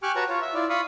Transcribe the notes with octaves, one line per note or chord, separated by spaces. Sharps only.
G4 G#5 C#6 D6 F6 F#6
F#4 B4 C#5 A5 A#5
F4 C#5
E5
E4 F4 D5
F4 F5 B5 C#6 D#6